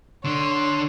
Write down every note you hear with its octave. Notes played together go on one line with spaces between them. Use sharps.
D3 D4 C#5 C6